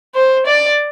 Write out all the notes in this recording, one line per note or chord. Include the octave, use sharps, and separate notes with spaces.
C5
D5